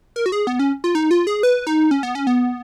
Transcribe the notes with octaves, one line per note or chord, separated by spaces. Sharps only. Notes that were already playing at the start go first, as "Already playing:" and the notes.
A#4
F#4
G#4
B3
C#4
F4
D#4
F4
G#4
B4
D#4
C#4
B3
C#4
B3